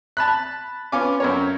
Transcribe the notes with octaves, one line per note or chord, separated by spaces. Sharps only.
A5 B5 F#6
B3 C#4 F4 G#5 D6
F#2 A#4 C#5